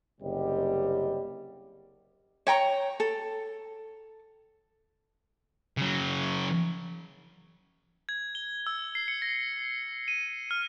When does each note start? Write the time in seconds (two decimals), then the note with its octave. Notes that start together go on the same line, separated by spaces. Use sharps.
0.21 F#1 C3 G3 G4 D#5
2.47 C#5 G5 A#5 C#6
3.00 A4
5.77 C#3 F#3
8.09 G#6
8.35 G7
8.67 E6
8.95 C7
9.08 C#7
9.22 A#6
10.08 D#7
10.51 F6